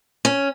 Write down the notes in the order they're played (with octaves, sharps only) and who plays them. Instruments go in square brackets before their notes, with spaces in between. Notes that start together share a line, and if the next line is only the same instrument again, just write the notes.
[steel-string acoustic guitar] C#4